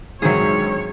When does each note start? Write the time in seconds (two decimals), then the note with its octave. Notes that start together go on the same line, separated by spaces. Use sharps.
0.22 A#1 G#2 D#3 F#3 C4 G#4 C#5 E5